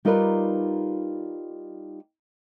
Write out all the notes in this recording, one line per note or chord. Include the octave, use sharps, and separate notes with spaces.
G3 D#4 F4 A#4 B4 D5